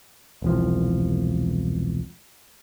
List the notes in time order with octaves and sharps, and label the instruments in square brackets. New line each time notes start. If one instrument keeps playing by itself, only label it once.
[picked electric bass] E1 C2 F3